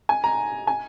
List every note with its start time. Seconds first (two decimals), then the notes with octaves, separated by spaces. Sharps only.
0.09 G#5
0.24 A#5
0.67 G#5